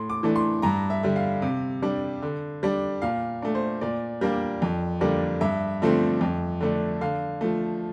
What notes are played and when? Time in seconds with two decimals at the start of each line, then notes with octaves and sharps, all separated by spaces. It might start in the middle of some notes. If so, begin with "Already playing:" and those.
Already playing: A2 C6
0.10 D6
0.23 E3 A3 D4
0.36 C6
0.62 G2 A#5
0.90 E5
1.03 D3 G3
1.16 F5
1.42 C3
1.82 G3 D4
2.22 D3
2.63 G3 D4
3.02 A#2 F5
3.42 A3 D4
3.55 C5
3.81 A#2 D5
4.21 G3 A#3 D4
4.62 F2
5.01 D3 G3 A#3 D4
5.41 G2 E5
5.82 D3 F3 A3 C4
6.21 F2
6.61 D3 A3 D4
7.01 D3 F5
7.41 F3 A3